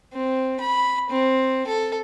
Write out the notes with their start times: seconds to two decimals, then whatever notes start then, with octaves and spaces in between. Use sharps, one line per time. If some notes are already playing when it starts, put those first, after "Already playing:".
0.13 C4
0.60 B5
1.10 C4
1.67 A4